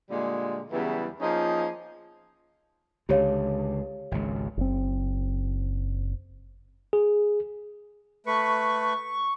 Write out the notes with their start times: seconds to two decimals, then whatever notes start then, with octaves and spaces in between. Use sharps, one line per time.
0.10 A#2 D3 G3 G#3
0.72 E2 C#3 E3 F#3 G3 B3
1.21 F3 A#3 C#4 D#4 G#4 D#5
3.09 C#2 D3 G4 C#5 F5
4.11 G#1 C#2
4.57 F#1 C4
6.93 G#4
8.26 A3 B4 C#6